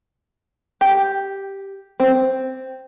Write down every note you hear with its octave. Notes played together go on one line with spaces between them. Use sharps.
G4
C4